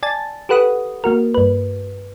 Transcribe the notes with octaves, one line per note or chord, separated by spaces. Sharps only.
D5 G#5 A5 A6
G4 A4 B4 F#5 B5 D#6
A#3 F#4 A#4
G2 B4